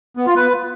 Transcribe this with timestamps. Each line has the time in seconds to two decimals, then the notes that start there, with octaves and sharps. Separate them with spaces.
0.17 B3
0.27 F4
0.36 B4